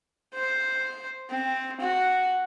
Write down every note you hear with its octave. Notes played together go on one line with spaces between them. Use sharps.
C5
C4
F#4